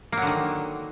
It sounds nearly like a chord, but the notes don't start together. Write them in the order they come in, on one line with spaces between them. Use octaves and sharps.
A#3 F#3 D3 D#3